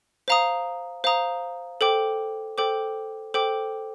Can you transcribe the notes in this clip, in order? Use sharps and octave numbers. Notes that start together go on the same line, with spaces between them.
C5 F5 A#5 D#6
C5 F5 A#5 D#6
A4 C5 G5 D6
A4 C5 G5 D6
A4 C5 G5 D6